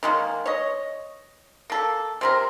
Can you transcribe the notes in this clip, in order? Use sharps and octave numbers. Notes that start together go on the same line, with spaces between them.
D#3 G#3 A#3
C#5 D#5
A#3 A4
C3 C4 A#4